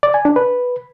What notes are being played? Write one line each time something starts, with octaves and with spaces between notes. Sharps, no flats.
D5
G#5
D4
B4